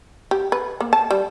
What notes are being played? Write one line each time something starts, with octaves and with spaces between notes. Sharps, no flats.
G4
B4
A#3
A5
G3